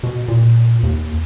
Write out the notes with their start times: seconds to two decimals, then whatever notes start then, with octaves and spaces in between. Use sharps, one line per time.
0.03 B2
0.28 A#2
0.83 D#2